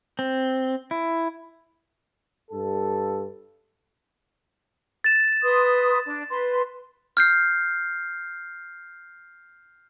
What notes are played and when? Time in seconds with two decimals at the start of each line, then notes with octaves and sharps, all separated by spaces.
0.19 C4
0.91 E4
2.51 G2 A4
5.04 A6 E7
5.43 B4 C6 D#6
6.06 D4
6.30 B4 C6
7.17 F6 G6 C7